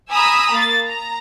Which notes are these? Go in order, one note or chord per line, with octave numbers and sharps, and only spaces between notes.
G#5 A#5 B5 D#6 E6
A#3 A6
A#5